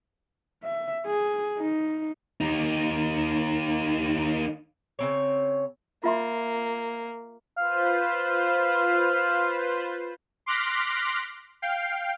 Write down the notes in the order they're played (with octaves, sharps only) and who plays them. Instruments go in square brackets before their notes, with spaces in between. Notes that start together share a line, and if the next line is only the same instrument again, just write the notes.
[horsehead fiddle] E5
G#4
D#4
[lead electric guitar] D#2 D#4
[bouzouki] C#3 C4 C#5
[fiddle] A#3 [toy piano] F4 E5 C6
[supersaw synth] F4 B4 C5 [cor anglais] F5
[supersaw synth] C6 D6 F6 F#6 A#6 B6
F5 G5 C7